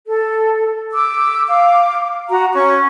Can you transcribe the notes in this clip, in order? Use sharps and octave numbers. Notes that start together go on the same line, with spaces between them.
A4
D6 E6
F5 D6
F#4 A#5
C#4 C#6